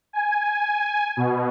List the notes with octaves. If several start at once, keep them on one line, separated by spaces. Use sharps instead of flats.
G#5
B2